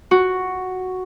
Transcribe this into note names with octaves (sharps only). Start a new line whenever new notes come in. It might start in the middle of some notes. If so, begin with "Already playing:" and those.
F#4